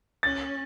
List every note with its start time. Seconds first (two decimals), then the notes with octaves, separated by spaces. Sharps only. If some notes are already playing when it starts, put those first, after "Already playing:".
0.23 C#4 A6